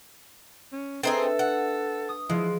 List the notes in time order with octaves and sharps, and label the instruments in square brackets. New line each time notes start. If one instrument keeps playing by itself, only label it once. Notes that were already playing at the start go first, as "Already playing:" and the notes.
[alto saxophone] C#4
[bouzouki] C4 D#4 G#4 [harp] D4 B4 E5 [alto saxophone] A4
[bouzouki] F#5
[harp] D#6
[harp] F3 [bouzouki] G#3 [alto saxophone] E4